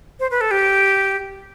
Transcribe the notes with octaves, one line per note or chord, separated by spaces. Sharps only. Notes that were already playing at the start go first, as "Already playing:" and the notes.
C5
B4
A4
G4